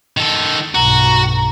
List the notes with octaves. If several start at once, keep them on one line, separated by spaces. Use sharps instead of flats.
D#3 A4
B1 G2 F#4 A#5